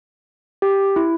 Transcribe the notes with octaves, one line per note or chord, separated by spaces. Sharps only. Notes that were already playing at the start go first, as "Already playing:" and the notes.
G4
E4